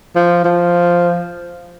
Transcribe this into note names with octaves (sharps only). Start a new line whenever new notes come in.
F3
F3